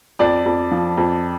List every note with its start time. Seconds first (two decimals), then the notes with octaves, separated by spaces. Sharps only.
0.19 F2 D5
0.46 F2
0.71 F3
0.97 F2